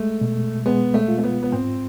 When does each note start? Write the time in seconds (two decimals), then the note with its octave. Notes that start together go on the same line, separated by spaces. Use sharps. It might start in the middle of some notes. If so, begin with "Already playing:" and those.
Already playing: G#3 A3
0.21 B2
0.66 G#3 B3
0.94 A3
1.08 F4
1.18 A3
1.23 B3
1.43 B3
1.52 G#2 C4